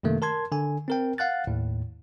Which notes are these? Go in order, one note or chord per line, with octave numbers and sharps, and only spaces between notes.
F#2 C3 D#3 A3 A#3
A#4 A5 C6 G#6
D3 G#5
C4 A#4 G5
F5 F#5 F#6 A6
D#2 A2